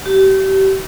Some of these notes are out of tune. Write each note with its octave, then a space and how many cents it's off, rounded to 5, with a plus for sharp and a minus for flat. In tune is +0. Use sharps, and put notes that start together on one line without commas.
G4 -30